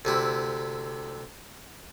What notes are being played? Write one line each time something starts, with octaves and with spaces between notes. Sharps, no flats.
D2 C3 E4